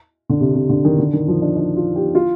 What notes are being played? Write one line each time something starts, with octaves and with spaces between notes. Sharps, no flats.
D3
C3
C3
D3
D#3
D3
D#3
F3
D4
D4
F4
G4
F4